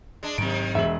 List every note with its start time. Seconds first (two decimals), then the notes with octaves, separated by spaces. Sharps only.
0.23 G#3 D4
0.38 G#2 C3 D#3 F#3 C4 D7
0.75 E1 G#3 E5 F#7